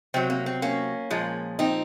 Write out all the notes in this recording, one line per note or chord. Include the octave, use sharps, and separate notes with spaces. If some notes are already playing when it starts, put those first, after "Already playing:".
C3 F#3 C4
A#3
C4
A#3 C#4
A#2 F3 G#3
C4 D#4